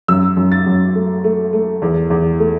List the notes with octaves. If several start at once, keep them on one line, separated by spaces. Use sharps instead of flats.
F#2 E6
F#2
A6
F#2
A3
A3
A3
E2
E2
A3